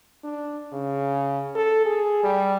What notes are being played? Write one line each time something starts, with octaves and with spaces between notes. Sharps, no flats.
D4
C#3
A4
G#4
G3